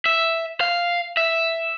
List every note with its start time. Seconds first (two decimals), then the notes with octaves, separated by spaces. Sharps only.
0.06 E5
0.61 F5
1.17 E5